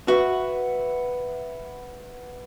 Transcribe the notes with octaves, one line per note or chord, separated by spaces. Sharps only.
F#4 B4 E5 F#5